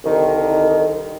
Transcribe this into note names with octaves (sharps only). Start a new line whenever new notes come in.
C2 D3 D#3